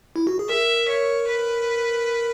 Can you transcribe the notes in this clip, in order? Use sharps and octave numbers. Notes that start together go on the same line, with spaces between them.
E4
F#4
G#4
A#4 E5
C#5
B4